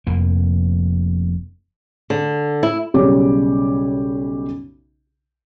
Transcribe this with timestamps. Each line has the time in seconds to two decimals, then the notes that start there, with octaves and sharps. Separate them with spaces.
0.07 F1 F2 A#3
2.10 D3
2.63 E4
2.94 B1 C#3 G3 G4 C#5 D6